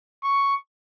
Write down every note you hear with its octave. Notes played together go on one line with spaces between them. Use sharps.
C#6